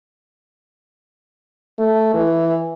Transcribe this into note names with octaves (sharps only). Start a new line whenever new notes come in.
A3
E3